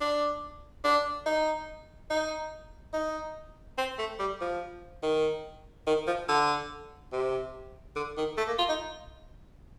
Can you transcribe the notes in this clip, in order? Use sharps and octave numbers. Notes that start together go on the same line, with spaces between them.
D4
D4
D#4
D#4
D#4
C4
A3
G3
F3
D#3
D#3
F3
D3
C3
D3
D#3
A3
A#3
F4
D#4